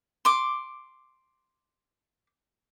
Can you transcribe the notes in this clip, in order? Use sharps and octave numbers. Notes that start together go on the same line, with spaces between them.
C6 D6